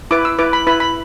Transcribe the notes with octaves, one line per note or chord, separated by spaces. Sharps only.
E4 B4 D6
E6
E4 B4 D6
B5
E4 B4 B5
B5